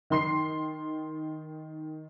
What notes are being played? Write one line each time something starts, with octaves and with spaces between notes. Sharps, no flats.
D#3 C6 C7